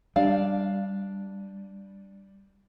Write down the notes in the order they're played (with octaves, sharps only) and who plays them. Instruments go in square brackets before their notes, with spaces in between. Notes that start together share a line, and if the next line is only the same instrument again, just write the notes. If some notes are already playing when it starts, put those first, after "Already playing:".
[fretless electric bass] G3 [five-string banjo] D4 F5